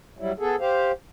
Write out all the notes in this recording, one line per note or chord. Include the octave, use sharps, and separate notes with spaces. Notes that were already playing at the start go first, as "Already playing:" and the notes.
F#3 G3 E4
B3 G#4 A4
G4 C5 F5